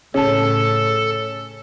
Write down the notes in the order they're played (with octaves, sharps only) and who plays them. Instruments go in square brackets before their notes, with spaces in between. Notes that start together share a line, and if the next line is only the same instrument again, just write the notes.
[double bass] A2 C#3 [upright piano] C#4 [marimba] G#4 A5 [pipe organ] A4